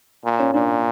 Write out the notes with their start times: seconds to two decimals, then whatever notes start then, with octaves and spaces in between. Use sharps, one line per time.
0.24 A#2
0.39 C#4
0.54 A#2 D4